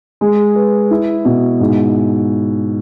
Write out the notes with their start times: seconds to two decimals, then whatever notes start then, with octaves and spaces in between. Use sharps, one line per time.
0.21 G#3
0.55 B4
0.91 E4
1.25 B2
1.60 G#2